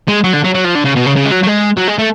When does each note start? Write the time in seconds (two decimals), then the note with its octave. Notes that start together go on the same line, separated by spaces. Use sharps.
0.08 G#3
0.24 F#3
0.33 D3
0.44 F#3
0.54 F#3
0.64 F3
0.75 D3
0.84 C#3
0.95 B2
1.06 C#3
1.16 C#3
1.25 G#3
1.31 F#3
1.43 F#3
1.47 G#3
1.77 F#3
1.88 G#3
1.98 A3